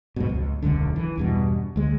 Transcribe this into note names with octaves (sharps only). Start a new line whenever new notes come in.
F2 G#2 B2
C#2
E1 C#2 F#2 D3
E3
E2 G2 B2
D2 G#3